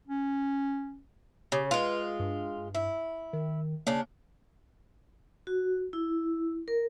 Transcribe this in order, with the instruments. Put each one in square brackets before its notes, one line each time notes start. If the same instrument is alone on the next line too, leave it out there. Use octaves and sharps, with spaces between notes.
[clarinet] C#4
[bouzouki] C#3 [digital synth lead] G4
[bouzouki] G#3 F4 [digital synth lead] B4
[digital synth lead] G2
[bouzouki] E4
[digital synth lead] D#3
[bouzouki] C#3 D4 [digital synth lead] A#3
[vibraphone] F#4
E4
A#4